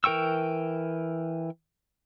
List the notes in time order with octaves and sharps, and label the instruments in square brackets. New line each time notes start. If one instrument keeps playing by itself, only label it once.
[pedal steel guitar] E3 A#4 G5 C#6 E6